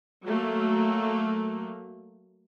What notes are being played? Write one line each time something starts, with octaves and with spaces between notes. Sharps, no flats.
F#3 A3 A#3